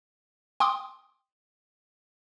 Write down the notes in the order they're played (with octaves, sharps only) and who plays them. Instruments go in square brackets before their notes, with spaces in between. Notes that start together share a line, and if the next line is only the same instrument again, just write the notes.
[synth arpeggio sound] G5 C6 D6 D#6